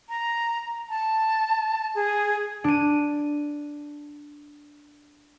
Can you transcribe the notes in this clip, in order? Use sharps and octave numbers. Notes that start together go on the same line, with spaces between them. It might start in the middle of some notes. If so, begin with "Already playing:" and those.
A#5
A5
G#4
D4 D#7